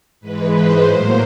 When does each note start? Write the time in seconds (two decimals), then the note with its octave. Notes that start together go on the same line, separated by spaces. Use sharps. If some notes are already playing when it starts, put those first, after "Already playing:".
0.20 G#2 E3 G#3 B4
0.52 C5
0.84 A2 F#3 A#3 C5